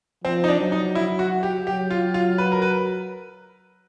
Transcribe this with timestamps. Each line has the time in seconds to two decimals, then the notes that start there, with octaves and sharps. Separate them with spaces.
0.24 F3 C4
0.44 D#4
0.48 D4
0.60 F#3
0.72 D#4
0.95 E4
1.19 F#4
1.43 G4
1.67 F#3 G4
1.91 F4
2.14 F4
2.38 B4
2.52 A#4
2.62 B4